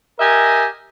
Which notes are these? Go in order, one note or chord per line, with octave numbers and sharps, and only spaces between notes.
G4 A#4 D#5 E5 G#5